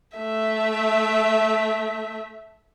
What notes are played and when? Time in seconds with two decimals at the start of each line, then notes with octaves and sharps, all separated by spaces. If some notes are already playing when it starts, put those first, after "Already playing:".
0.17 A3 E5